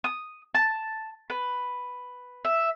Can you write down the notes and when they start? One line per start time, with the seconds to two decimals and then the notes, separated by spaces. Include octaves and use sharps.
0.04 D#6
0.54 A5
1.30 B4
2.45 E5